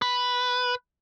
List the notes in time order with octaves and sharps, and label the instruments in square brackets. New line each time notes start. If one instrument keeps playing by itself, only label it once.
[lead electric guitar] B4